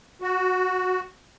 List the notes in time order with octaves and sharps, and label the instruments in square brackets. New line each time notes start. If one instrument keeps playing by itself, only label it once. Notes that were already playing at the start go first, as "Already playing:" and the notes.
[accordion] F#4